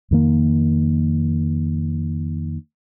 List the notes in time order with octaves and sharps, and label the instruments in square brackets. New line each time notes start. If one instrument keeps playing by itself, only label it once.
[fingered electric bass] F2 D#3 A#3